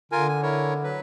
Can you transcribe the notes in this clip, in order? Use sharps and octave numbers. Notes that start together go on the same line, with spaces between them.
D3 F4 A#4 G#5
G#5
E4 A#4 C#5
F#3 B4